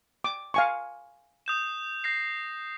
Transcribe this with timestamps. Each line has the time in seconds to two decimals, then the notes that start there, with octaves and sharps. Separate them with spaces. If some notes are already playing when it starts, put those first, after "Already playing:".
0.24 D6
0.54 F5 G#5 C#6
1.46 D#6 G6 E7
2.04 G6 A#6 C7